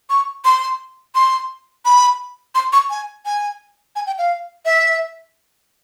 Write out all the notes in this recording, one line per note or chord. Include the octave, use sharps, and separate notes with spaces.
C#6
C6
C6
B5
C6
C#6
G#5
G#5
G#5
G5
F5
E5